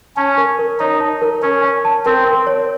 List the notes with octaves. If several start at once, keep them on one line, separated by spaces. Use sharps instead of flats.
C#4 A5
A#4
A#4
D#4 C#5
A5
A#4
C#4 A#4
C#5
A5
C4 A#4
A#4
C#5